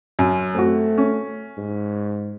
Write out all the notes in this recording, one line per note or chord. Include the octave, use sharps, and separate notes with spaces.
F#2
A3 C4 F#4
C#4
G#2